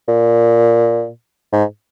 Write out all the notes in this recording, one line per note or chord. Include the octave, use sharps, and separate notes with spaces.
A#2
G#2